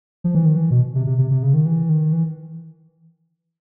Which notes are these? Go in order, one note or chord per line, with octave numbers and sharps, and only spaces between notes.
F3
E3
D#3
E3
B2
C3
C3
C3
C3
C#3
D#3
E3
D#3
E3